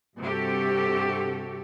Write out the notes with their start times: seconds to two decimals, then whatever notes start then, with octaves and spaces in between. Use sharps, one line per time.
0.19 G2 C3 F#4 G4 A4